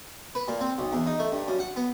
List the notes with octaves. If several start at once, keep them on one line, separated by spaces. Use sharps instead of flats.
B4
A#2
C4
B1
E2
D#4
A3
G2
F#2
F#5
B3